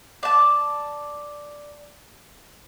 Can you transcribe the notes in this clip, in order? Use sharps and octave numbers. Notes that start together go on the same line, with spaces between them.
D5 A5